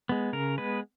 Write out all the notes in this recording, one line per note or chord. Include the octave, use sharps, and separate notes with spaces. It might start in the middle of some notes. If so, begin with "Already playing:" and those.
G#3 B3
C#3 A#4
G#3 B3 B4